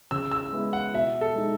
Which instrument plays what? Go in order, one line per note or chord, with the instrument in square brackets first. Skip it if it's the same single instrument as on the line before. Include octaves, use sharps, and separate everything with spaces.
[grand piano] C#3 E6
E6
G#3 B3 E4
F#5
B2 E5
A4
G#3 D#4